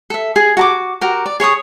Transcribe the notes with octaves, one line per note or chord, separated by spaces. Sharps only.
A4 E5
G#4
F#4 A5 D6
F#4 G4 A#4
D5
G#4 C#5 C#6 D#6